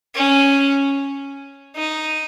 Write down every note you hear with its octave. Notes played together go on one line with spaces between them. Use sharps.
C#4
D#4